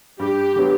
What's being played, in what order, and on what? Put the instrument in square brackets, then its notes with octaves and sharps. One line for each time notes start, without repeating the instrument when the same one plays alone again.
[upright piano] G2 [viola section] G4
[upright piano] D3 F#3 B3